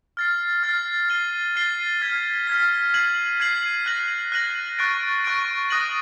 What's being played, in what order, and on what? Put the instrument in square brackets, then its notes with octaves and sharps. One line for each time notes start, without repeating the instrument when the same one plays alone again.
[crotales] F6 A6 C7
F6 A6 C7
A6 C7 D#7 G7
A6 C7 D#7 G7
F6 G#6 B6
F6 G#6 B6
G#6 C7 D#7 F#7
G#6 C7 D#7 F#7
F#6 A#6 D#7 F#7
F#6 A#6 D#7 F#7
C#6 F#6 A6 D7
C#6 F#6 A6 D7
D#6 F#6 A#6 D#7 F#7